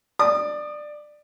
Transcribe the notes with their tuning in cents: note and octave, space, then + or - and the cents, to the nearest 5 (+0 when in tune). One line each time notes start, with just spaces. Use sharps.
D5 +15 D#6 -20